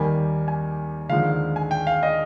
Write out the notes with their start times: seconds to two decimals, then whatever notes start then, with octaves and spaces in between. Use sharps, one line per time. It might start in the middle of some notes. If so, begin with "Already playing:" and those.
Already playing: D#2 D#3 G3 A#3 G#5
0.48 G#5
1.09 D#2 D3 F3 G#3 F5
1.56 G#5
1.71 G5
1.87 F5
2.03 D#5